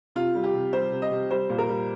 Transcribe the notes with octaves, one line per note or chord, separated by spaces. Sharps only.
C3 F4
G3
G4
C3
G3 C5
C3
D#5
C3
G3 C5
A#2
A#4
G3